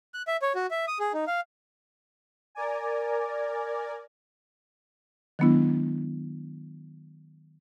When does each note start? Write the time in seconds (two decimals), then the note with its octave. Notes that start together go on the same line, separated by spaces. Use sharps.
0.14 F#6
0.27 E5
0.42 C#5
0.55 F#4
0.71 E5
0.88 D#6
1.00 G#4
1.14 D#4
1.27 F5
2.55 A#4 D5 G#5
5.39 D#3 F#3 G#3 B3 D4 E4